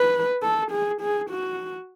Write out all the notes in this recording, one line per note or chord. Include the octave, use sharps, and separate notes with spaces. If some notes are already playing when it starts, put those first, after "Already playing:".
Already playing: B4
A4
G#4
G#4
F#4